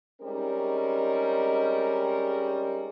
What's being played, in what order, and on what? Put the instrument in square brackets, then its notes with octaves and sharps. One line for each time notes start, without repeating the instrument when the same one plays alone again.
[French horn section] G3 G#3 C4 C#4 D#4 A#4